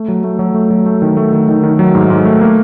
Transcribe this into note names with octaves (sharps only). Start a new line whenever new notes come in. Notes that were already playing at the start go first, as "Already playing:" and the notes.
Already playing: A3
F#3
A3
F#3
A3
F#3
A3
D#3
A3
D#3
D#3
D#3
F#3
G#2
G#2
A3
A#3